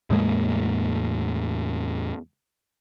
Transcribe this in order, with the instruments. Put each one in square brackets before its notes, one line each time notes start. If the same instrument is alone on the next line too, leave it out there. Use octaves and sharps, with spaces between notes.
[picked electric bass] E2 A2 G#3 A#3